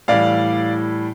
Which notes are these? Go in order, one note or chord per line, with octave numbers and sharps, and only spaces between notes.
A2 E3 G3 D5 F5